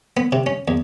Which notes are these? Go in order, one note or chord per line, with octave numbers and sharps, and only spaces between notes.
B3
C3
C#4
E2